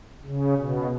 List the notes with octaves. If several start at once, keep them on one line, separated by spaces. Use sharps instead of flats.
C#3
B2